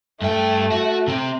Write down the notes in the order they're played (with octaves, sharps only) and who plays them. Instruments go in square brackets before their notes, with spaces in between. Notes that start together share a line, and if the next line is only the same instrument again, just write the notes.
[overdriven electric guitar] G2 G5 [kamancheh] A3
[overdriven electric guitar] F#4
C3 C4